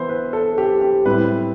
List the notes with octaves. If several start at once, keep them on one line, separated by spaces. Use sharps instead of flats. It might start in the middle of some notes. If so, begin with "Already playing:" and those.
Already playing: E3 B3 E4 C5
B4
A4
G4
G4
A2 G3 C4 E4 B4